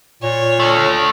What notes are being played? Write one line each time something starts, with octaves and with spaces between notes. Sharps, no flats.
A#2 C#5
A3 D4